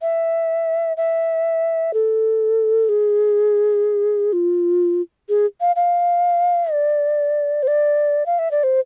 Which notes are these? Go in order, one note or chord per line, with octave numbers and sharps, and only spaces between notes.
E5
E5
A4
G#4
F4
G#4
F5
F5
D5
C5
D5
F5
E5
D5
C5